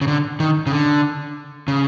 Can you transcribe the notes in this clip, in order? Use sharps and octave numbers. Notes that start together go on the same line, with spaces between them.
C#3
D3
D#3
C#3
D3
C#3